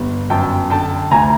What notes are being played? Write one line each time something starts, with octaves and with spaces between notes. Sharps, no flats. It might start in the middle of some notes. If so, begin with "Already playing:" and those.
Already playing: G1
F#2 G5 A5
D3 G5 A5
D2 G#5 A#5